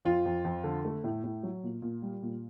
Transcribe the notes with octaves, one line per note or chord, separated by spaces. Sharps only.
F2 F4
F2
F2
D3
A3
A2
A2
F#3
A#2
A#2
G3
A#2